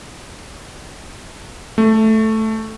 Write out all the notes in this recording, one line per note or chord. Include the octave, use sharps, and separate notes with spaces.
A3